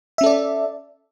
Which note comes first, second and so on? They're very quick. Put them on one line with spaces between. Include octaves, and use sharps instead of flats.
E5 C#4 A4 D5